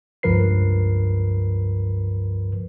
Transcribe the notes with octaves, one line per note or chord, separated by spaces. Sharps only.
C#2 G2 F3 A#4 B4 C7